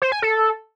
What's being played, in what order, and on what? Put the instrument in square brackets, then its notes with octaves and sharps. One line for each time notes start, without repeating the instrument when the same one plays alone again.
[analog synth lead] C5
G#5
A4